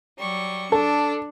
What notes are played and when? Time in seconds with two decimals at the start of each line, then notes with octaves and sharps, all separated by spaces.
0.20 F#3 G3 C#6
0.72 D4 A4